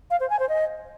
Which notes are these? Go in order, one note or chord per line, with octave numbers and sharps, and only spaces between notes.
F5
C5
G#5
C5
D#5